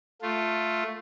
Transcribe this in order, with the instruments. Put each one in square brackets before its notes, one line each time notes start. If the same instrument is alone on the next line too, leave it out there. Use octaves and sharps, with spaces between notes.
[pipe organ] A3 F4